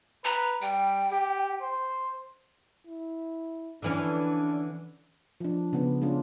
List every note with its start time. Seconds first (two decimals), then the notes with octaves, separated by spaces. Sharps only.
0.25 B4 A#5
0.62 G3 G5
1.12 G4
1.62 C5
2.87 E4
3.82 D3 E3 C#4 D4
5.40 F3 D4
5.73 C#3 B3
6.02 G#3 C#4 D4 F4